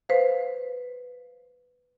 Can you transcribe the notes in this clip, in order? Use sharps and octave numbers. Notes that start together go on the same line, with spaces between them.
B4 C5 F5